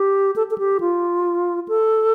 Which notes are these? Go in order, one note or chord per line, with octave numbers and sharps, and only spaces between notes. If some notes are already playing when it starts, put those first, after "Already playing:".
Already playing: G4
A4
A4
G4
F4
A4